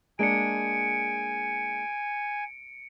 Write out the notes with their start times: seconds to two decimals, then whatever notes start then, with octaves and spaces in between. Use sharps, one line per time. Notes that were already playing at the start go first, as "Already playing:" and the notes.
0.19 G#3 A#3 D4 G#5 C#7 D7